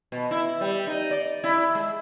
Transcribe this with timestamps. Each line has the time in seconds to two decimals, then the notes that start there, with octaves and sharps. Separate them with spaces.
0.12 B2
0.31 E4
0.61 G3
0.87 D#4
1.11 D5
1.44 E4
1.75 G#3